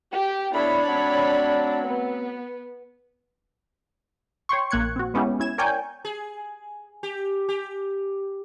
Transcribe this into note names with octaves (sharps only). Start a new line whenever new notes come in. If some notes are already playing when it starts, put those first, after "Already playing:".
G4
A3 B3 D4 E4 C#5 B5
F#3 A3 C4
B3
C#5 G5 C6 C#6
A#1 A#3 F#6 G#6 C#7
C4 F#4
G#3 B3 C#4 E4 G4
C#4 E4 G#6 E7
A#4 C#5 D5 G5 G#5 G6
G#4
G4
G4